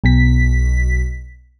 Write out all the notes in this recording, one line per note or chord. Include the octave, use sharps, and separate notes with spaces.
B1 B2 B6